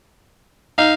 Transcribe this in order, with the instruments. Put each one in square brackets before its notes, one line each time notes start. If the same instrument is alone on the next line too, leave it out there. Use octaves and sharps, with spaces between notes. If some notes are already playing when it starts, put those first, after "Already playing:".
[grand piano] D#4 [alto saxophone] F5